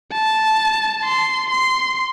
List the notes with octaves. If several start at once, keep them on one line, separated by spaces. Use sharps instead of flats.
A5
C6
C6